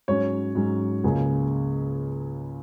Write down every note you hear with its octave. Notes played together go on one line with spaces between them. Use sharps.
G#2 F#3 C#4 C#5
G#2 F#3 C#4
C#2 C#3 A#3 C#4